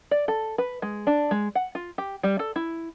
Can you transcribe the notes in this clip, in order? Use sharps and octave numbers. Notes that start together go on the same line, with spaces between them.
D5
A4
B4
G#3
D4
G#3
F#5
F4
G4
G3
A4
E4